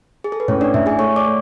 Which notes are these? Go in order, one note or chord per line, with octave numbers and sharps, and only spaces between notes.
G#4
A4
B4
A2 C#4 C#5
D4 D5
A2 E4 E5
G#4 G#5
A3 C#5 C#6
D5 D6
A3